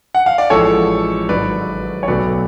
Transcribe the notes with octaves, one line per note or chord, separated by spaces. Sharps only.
F#5
F5
D5
A1 A2 F3 G#3 A4 C#5
G#1 G#2 F#3 B4 D5
C#5
B1 B2 F#3 A3 B4 D5